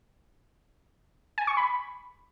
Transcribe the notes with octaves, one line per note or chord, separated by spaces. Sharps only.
G#5
C#6
B5